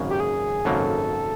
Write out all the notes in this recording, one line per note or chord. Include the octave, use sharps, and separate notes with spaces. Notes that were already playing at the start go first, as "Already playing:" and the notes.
Already playing: G#1 F#2 C#3 F#3 A#3
G4
G#4
G#1 F#2 C#3 F#3 A#3 A4